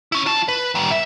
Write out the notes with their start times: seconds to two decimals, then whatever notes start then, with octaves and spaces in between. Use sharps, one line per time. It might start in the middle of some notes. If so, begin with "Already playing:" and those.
0.12 C#4 E4
0.26 F4 A5
0.48 B4
0.75 D#3 G3
0.91 E5